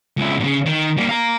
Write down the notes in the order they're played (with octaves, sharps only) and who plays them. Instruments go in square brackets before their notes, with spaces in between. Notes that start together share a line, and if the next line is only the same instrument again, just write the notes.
[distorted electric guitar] C#2 E4
A#2 C#3
D#3
G3 A#3
F5 A#5